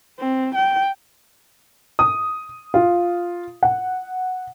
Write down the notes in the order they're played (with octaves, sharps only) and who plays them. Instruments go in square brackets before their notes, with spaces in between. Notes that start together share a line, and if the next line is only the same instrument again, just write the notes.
[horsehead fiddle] C4
G5
[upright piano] D#6
F4
F#5